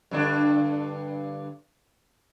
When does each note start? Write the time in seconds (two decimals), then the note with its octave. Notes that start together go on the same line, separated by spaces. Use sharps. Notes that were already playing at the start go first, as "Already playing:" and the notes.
0.11 G2 D3 D4